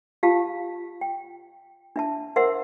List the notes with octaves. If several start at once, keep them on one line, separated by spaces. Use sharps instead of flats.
F4 G4 F5 A5
G5
D4 E5 A5
A#4 C5 E5 F#5 C6 E6